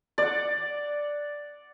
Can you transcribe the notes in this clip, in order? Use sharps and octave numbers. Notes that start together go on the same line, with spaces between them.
D5 F#5